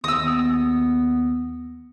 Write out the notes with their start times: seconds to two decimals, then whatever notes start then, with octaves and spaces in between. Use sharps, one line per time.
0.04 D#2 B3 D#6 E6 A#6